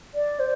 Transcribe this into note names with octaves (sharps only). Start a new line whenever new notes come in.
D5
C5